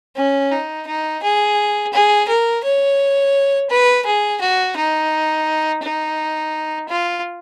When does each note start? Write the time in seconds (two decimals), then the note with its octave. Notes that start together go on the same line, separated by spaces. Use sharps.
0.16 C#4
0.51 D#4
0.87 D#4
1.23 G#4
1.93 G#4
2.28 A#4
2.64 C#5
3.70 B4
4.05 G#4
4.41 F#4
4.76 D#4
5.83 D#4
6.89 F4